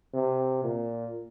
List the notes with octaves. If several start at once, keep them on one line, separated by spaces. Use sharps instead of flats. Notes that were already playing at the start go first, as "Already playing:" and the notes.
C3
A#2